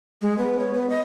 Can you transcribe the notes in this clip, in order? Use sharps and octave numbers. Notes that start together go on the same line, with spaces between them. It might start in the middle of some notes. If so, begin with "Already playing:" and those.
G#3
B3
C#5
B3
D#5